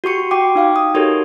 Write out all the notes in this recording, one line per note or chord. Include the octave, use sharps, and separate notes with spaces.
F#4 G4 C#6 C#7
F#4 G5 D6
D#4 F5 G5
D#6
D#4 F#4 G4 A4 A#4 C#5